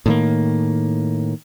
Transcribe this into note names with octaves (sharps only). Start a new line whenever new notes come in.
A2 D#3 A#3